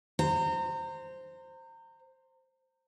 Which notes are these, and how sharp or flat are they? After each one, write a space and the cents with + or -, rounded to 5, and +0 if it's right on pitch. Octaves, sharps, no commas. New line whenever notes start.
C5 +0 A#5 -30